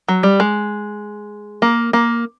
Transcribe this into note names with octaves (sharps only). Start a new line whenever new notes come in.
F#3
G3
G#3
A#3
A#3